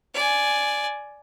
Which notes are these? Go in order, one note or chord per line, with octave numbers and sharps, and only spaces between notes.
D5 G#5